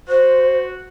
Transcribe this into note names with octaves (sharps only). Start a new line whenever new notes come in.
F#4 C5